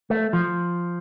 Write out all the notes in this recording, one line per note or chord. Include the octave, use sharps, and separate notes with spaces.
A3
F3